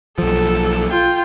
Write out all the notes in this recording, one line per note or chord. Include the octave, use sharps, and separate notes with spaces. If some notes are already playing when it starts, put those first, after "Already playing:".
B1 F3 A4
F4 G5